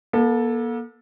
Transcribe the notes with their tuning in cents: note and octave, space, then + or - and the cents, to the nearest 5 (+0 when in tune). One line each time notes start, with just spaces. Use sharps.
A#3 +45 A4 +0